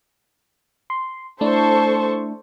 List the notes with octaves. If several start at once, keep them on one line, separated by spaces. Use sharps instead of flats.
C6
A3 D4 E4 A4 C5 C#6